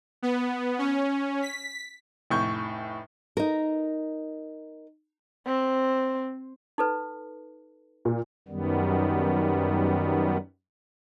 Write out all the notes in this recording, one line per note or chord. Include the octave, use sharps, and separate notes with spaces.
B3
C#4
B6
F1 A2 C#6 G6
D#4 A#4
C4
D#4 A4 B4
A#2
F#2 D#3 G3 B3